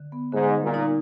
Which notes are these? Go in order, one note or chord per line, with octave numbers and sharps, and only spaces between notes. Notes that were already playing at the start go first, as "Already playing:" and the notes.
Already playing: D3
B3
G#2 D3
G3
A#2
D#4